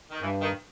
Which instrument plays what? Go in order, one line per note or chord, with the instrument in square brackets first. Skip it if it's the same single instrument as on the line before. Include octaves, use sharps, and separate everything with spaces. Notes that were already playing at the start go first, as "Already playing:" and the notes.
[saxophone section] D#3
[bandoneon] G2 [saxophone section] E3
[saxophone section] D#3